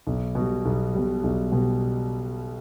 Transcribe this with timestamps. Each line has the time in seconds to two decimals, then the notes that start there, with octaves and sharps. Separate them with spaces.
0.07 B1
0.35 B2
0.40 G3
0.65 B1
0.94 B2 G3
1.23 B1
1.52 B2 G3